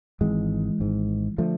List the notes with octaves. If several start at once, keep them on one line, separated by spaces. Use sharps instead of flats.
G#1 G#2 E3 G#3
G#1 G#2
D3 F3 A3